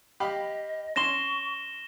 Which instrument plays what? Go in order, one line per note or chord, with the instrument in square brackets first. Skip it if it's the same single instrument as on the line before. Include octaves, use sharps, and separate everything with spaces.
[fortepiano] G4 F5 B5 [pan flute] D#5
[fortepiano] C#4 C6 [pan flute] C#6 [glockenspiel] A#6 E7 G7